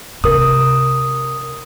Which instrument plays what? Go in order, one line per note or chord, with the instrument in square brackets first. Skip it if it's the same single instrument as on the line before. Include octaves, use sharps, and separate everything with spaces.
[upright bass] C3 [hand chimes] A#4 D#6